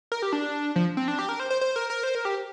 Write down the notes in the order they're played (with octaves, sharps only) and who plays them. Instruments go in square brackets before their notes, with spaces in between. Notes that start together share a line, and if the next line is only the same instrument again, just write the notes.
[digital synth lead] A#4
G4
D4
F3
C4
D4
G4
A#4
C5
C5
C5
A#4
A#4
C5
A#4
G4